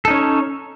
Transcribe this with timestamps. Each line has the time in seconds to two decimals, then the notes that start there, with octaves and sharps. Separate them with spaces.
0.05 A4
0.08 D#4
0.10 C#4
0.13 C#5